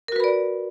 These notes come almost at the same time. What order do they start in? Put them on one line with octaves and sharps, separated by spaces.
A#4 F#4 B4 B5 D5